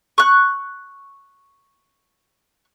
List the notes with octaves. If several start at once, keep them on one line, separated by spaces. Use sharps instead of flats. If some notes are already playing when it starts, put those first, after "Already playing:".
C#6 F#6